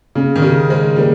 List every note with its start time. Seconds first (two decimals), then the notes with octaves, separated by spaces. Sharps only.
0.15 C#3 C#4
0.36 D#3
0.42 C#3 G4
0.70 G#3 C5
0.96 G3 A#3